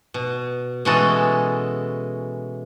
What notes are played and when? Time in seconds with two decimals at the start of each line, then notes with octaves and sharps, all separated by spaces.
0.14 B2
0.85 B2 E3 G#3 C#4 F#4 A4